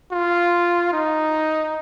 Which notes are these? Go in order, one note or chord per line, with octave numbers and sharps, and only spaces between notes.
F4
D#4